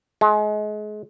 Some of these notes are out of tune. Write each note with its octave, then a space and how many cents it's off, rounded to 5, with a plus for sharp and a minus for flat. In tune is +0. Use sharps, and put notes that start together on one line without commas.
G#3 +30